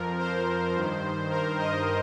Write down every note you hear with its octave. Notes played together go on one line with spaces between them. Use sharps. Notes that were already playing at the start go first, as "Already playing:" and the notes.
Already playing: F2 F3 A#4
C5
G2 D#3
A#4
D#5